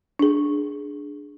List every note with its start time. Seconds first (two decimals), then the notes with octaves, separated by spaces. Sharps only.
0.19 D4 G#4